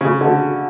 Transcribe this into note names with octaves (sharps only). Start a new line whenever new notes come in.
C#3
D3